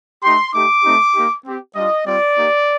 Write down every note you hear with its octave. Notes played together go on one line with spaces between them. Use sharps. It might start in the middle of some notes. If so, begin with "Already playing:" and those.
A3 D#4 G4 C6
A3 D#4 G4 D6
A3 C4 D#4 G4
A#3 D#4 G4
C4 G4
G3 D4 F4 D#5
G3 C4 F4 D5
A#3 D#4 G4